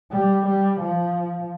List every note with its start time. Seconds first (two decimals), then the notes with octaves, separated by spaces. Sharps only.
0.12 G3
0.46 G3
0.81 F3